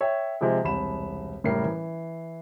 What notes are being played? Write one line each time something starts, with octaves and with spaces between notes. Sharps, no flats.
C#5 E5 G5
C3 F3 G#3 G#4
E1 C2 B5 E7
F#1 A2 G3 A#4 C7
E3